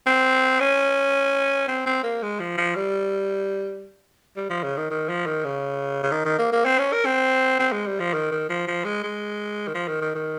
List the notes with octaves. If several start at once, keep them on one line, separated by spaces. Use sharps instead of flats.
C4
C#4
C4
C4
A#3
G#3
F3
F3
G3
G3
F3
C#3
D#3
D#3
F3
D#3
C#3
C#3
D#3
D#3
A#3
A#3
C4
C#4
A#4
C4
C4
G#3
G3
F3
D#3
D#3
F3
F3
G#3
G#3
D#3
F3
D#3
D#3
D#3